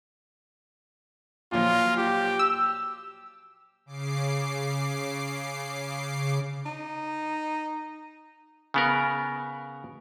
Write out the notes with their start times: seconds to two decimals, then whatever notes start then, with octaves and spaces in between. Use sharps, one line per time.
1.52 A#2 F3 F#3 F4
1.97 G4
2.39 E6
3.86 C#3 D6 C7
6.66 D#4
8.74 C#3 B3 A#4